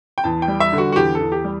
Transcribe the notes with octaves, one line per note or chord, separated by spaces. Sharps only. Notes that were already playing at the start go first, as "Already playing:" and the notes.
G5
E2 A5
G5
G3
E5
D3
F#4
F#4
E2 G4
A4
E2
G4
G3